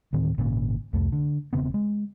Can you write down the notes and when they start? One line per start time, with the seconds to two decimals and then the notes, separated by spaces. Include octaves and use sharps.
0.13 D2 A2 D#3 C4
0.38 G#1 A#2 C#3
0.93 C2 F2 A3
1.12 D3
1.53 E1 C#3 B3 C4
1.74 G#3